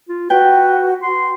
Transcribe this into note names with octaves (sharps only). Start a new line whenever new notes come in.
F4
F#4 B4 G5
F#4 C6